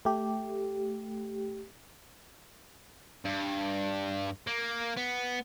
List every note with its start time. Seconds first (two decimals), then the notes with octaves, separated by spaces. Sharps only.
0.05 A3 G4
3.25 G2
4.47 A#3
4.97 B3